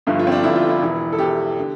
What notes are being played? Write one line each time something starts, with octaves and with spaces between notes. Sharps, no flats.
G1 G2 D3 F3
F4
C4
D4
G1 G2 D3 F3 E4
F4
E4
E1 E2 E3
A4
E1 E2 E3 G4
D3